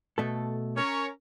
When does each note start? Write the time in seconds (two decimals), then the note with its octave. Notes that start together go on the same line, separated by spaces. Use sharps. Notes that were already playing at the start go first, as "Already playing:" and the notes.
0.18 B2 A3 A4
0.77 C#4 A#4 C#5